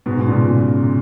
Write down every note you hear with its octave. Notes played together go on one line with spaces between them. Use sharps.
G#2 B2
B2
A#2 C#3